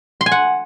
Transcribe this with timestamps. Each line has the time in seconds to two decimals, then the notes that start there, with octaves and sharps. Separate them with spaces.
0.21 C6
0.26 G#5
0.32 F#5